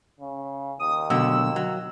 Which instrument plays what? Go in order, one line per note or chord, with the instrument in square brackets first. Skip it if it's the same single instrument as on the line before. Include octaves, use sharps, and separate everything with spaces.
[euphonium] C#3
[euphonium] D#2 [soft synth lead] D#6
[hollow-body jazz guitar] B2 D3 F#3 [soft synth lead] E6
[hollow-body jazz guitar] F#3